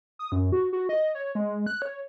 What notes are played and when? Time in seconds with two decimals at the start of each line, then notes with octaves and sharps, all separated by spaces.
0.19 D#6
0.32 F#2
0.52 F#4
0.73 F#4
0.89 D#5
1.15 C#5
1.35 G#3
1.66 F#6
1.82 C#5